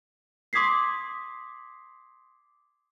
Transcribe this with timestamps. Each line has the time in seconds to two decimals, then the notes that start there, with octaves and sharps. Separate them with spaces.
0.53 C6 D6 D#6 G#6 B6 C7